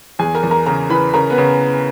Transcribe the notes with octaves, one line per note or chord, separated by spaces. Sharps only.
E2 G#4 G#5
A#4 A#5
E2
A#4 A#5
C#3 A#4 A#5
E3 B4 B5
C#3 A#4 A#5
B3 B4
C#3